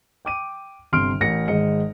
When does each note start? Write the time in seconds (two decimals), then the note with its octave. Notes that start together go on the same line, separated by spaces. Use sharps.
0.25 G5 D6 D#7
0.93 G1 C3 C6 F6 D7
1.21 A1 A#4 A#6 C#7
1.48 G#1 G#3 D#5 C#7